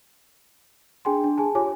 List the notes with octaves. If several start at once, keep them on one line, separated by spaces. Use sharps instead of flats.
D4 G#4 G5 G#5 C6
D4
G#4 G#5 A5
F4 G4 C#5 G#5 D6